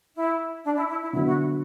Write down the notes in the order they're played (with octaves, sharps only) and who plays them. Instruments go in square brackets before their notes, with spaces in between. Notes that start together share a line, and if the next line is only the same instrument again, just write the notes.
[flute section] E4
D4
E4
E4
E4
[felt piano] D3 F#3 B3 [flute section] E4
[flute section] F#4